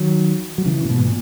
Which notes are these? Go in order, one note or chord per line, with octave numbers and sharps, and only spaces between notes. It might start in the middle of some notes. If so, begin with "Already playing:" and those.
Already playing: D#3 F#3
F#3
C#3 E3
A#2
G#2 B2
A#2